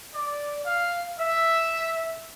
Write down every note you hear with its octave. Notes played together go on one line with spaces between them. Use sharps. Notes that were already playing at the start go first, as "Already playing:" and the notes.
D5
F5
E5